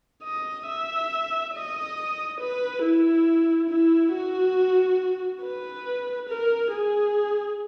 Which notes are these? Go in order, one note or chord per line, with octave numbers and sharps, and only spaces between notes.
D#5
E5
D#5
B4
E4
E4
F#4
B4
A#4
G#4